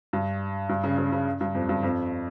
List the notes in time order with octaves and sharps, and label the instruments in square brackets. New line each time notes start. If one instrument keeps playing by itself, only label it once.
[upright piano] G2
G2
C#3
C#3
C#3
G2
F2
G2
F2